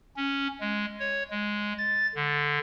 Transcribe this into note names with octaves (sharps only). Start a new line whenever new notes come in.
C#4
G#3
C#5
G#3
A6
D3